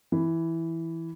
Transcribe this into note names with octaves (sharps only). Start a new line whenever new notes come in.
E3